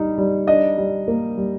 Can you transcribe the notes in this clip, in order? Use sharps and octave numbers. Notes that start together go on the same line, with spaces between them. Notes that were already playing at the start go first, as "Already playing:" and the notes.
Already playing: G3 D#4
G3
D4 D#5
G3
A#3
G3